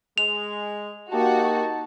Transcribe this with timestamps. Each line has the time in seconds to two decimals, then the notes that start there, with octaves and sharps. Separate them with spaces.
0.18 G#3 F7
1.12 A#3 D#4 F#4 G4 A5